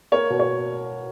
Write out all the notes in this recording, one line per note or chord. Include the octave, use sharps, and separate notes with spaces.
A#3 A#4 C#5
B2
C#5